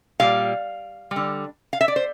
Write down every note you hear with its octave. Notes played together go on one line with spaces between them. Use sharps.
A#2 G3 F5
G3
D3
F5
E5
D5
C5